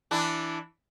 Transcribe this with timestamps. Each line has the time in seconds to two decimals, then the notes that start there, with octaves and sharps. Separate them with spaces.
0.11 E3 D4 E4